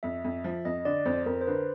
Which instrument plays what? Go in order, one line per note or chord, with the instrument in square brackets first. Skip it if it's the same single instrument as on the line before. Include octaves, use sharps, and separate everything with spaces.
[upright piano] F2 [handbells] E5
[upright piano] F2
F3
[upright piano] F2 [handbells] D#5
[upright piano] D3 [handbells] D5
[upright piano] F2 [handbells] C5
[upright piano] F2 [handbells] A#4
[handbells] C5
[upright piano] D3 [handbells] B4